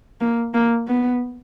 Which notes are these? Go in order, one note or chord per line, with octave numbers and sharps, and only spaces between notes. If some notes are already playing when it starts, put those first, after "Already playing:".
A#3
A#3
B3